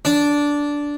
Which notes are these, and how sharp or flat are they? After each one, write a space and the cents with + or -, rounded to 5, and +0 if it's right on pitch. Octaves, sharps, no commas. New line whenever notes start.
D4 -10